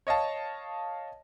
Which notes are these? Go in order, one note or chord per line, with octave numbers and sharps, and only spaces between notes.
C#5 D#5 F5 A5